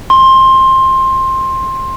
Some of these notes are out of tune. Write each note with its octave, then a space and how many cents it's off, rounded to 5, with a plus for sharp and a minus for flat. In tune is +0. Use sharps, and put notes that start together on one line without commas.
C6 +15